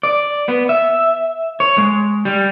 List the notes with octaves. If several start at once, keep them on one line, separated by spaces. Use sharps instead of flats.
D5
B3
E5
C#5
G#3
G3